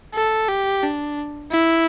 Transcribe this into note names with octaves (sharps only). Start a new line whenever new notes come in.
A4
G4
D4
E4